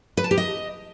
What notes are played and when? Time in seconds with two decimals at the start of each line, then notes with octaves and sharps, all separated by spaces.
0.17 B4
0.24 A5
0.31 G4
0.38 D#5